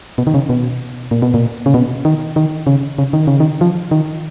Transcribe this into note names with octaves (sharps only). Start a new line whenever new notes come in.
B2
D#3
C#3
B2
A#2
B2
A#2
C#3
B2
D#3
D#3
C#3
C#3
D#3
C#3
D#3
F3
D#3